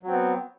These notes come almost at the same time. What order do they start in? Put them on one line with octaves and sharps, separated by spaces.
F#3 C4 B3